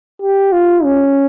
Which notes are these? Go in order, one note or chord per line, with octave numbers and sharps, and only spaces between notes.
G4
F4
C#4